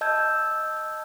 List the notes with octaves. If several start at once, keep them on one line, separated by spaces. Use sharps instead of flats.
D#5 A5 E6 G6 G#6